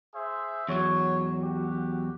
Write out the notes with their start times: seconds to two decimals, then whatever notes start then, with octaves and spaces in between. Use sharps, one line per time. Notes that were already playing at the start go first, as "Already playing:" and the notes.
0.14 G#4 C5 E5
0.68 E2 F#3 C#5
1.42 F#4 G4